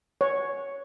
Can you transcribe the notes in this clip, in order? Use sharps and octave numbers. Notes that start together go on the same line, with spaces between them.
C#5